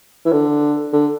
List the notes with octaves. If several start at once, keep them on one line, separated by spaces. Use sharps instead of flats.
E3
D3
D3